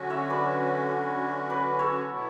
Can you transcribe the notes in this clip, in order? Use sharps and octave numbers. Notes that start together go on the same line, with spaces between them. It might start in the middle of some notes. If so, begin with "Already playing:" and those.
Already playing: D3 F#3 C#4 F#4
C#5 E5
B4 D5
B4 D5
A4 C#5
B2 F#3 B3 E4